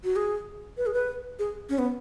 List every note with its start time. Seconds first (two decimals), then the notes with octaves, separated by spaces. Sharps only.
0.04 F#4
0.16 G#4
0.77 B4
0.86 G#4
0.94 B4
1.39 G#4
1.70 C#4
1.79 B3